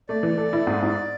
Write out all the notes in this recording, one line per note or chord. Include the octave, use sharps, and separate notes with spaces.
A3 D5
E3
A4
E4
G#2
G#2